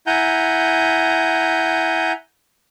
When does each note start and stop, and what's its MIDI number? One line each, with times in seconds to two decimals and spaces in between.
0.07 2.12 64
0.07 2.12 78
0.07 2.12 80
0.07 2.12 82
0.07 2.12 91